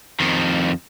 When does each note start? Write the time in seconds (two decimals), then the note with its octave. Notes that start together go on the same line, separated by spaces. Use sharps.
0.20 F2 D#3